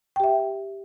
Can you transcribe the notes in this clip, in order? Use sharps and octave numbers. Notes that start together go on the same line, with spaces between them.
G4 E5 G5